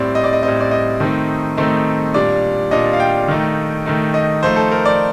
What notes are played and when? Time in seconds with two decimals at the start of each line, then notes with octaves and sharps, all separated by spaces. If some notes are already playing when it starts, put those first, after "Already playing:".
Already playing: A2 G3 C4 D5
0.15 D#5
0.24 D5
0.33 D#5
0.43 A2 G3 C4 D#5
0.61 D5
0.71 D#5
1.00 D#3 A3 C4 D#4
1.57 D#3 A3 C4 D#4
2.14 A#2 G3 D4 D5
2.71 A#2 G3 D4 D#5
2.93 F5
3.00 G5
3.28 D#3 A3 D#4
3.86 D#3 A3 D#4
4.14 D#5
4.43 F3 A3 D#4 C5
4.56 A4
4.72 A#4
4.86 D5